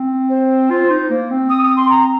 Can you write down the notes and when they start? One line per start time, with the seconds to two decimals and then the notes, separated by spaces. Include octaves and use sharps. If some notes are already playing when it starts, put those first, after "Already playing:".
Already playing: C4
0.29 C5
0.70 F4
0.90 D#4
1.10 A#3
1.31 C4
1.49 D#6
1.63 D#6
1.77 C6
1.90 A#5